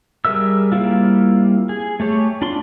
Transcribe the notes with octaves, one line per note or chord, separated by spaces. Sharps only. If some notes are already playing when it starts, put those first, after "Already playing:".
G3 G#4 A#4 E5 E6
G3 A#3 C4 E4 F4
G#4
A3 G4 C#5
D4 F4 B5 C6